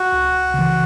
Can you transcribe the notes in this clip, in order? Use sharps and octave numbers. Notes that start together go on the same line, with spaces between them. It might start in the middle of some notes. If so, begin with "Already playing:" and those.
Already playing: F#4
C#2
C#3 E3